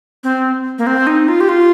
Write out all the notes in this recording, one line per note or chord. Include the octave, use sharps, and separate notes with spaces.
C4
A#3
C4
D#4
F4
G4
F4